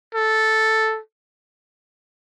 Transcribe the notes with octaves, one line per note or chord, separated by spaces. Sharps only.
A4